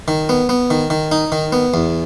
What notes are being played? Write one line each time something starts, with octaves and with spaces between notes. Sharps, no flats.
D#3
B3
B3
D#3
D#3
D#4
D#3
B3
E2